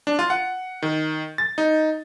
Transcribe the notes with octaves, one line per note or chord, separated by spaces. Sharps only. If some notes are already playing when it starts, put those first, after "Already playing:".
D4
F4
F#5
D#3
A6
D#4